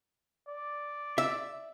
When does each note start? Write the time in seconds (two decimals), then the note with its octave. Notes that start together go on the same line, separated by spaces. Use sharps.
0.49 D5
1.18 E5